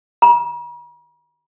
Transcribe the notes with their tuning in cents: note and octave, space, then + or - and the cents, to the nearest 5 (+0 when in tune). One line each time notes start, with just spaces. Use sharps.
A#5 +45